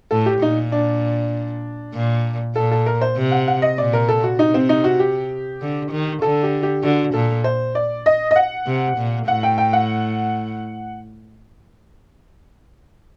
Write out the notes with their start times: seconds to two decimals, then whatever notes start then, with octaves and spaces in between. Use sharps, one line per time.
0.11 A2 A4
0.26 G4
0.41 A#2 D#4
0.72 D4
1.94 A#2
2.55 A#2 A4
2.71 A4
2.86 A#4
3.01 C5
3.17 C3
3.31 F#5
3.48 F#5
3.62 D#5
3.78 A#2 D5
3.93 A#4
4.08 A4
4.23 F#4
4.39 C3 D#4
4.54 C4
4.69 D#4
4.84 F#4
5.00 G4
5.61 D3
5.91 D#3
6.22 D3 A4
6.43 G4
6.63 G4
6.83 D3 F#4
7.14 A#2 A4
7.44 C5
7.75 D5
8.06 D#5
8.31 D#5
8.36 F#5
8.66 C3
8.97 A#2
9.28 A2 F#5
9.43 G5
9.58 G5
9.73 F#5